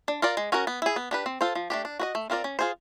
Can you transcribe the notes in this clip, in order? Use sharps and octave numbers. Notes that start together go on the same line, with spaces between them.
D4
F4 A#4 D5
G#3
C#4 F#4 A#4
B3
E4 G#4
B3
D4 G4 B4
C4
F4 A4 C5
F3
A3 D4 G4
D4
F#4 B4 D#5
A3
C4 F4 A#4 D5
C#4
F4 G#4 C5